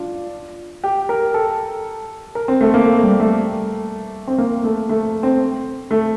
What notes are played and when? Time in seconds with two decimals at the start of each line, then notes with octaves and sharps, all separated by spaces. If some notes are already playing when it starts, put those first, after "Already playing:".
Already playing: D4 F4
0.84 G4
1.09 A#4
1.34 A4
2.35 A#4
2.48 C4
2.61 A3
2.74 A#3
2.86 A3
3.03 G3
3.20 A3
4.27 C4
4.38 A#3
4.64 A3
4.89 A3
5.23 C4
5.91 A3